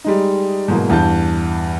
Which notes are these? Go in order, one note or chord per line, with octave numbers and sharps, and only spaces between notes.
G3 G#3 D#4
G#2 B2 E3 F#3 A#3
E2 G2 E3 A5 G6